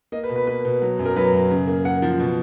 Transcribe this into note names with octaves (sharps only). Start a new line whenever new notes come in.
A#3 D#5
B4
B2
B4
A#3 B4
B2
F#3
F#2
A#4
F#3 B4
F#2
C#3
A#3
A#3 F#5
F3
B2